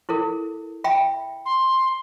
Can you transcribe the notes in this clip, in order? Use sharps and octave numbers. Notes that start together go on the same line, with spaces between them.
E4 A4 A#4
E5 G5 B5
C6